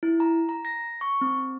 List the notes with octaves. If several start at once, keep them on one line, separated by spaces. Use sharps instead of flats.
E4
A#5
A#5
A#6
C#6
C4